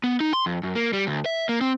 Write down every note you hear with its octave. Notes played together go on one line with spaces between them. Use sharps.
B3
D#4
C6
F2
F#2
A#3
G3
D2
E5
A#3
C4